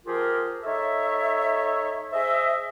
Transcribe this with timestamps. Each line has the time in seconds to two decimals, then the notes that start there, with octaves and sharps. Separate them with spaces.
0.06 F3 F4 G4 G#4 A#4
0.64 D#4 A4 C#5 E5
2.13 G#4 C5 D#5 E5